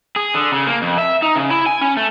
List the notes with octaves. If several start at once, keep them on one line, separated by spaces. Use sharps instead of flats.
G#4
D3
C#3
A#3
F2
E5
D#4
C#3
E4
G#5
C#4
A3